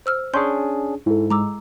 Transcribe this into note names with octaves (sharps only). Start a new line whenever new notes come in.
C5 E6 F6
C#4 D4 G#4 C6 C#6 G6
G#2 E4 A4
G#3 A#5 D6 E6